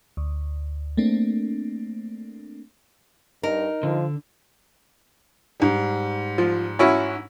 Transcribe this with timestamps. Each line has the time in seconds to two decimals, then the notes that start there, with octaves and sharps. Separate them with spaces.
0.17 D2
0.97 A3 A#3 C4 D4
3.43 G2 D#4 A#4
3.83 D3 F3
5.60 G#2 G3
6.38 F3
6.79 C#4 E4 F#4